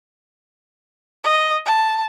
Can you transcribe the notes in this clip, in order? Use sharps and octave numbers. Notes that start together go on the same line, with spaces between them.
D#5
A5